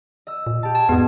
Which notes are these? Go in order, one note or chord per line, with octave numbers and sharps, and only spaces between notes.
D#5 E6
A#2
G4 A5
A5 G#6
E2 G#2 B3 F#4 D#5